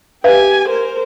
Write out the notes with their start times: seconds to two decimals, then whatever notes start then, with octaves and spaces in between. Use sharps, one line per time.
0.24 G4 B4 E5 F5 G#5
0.69 A#4 C5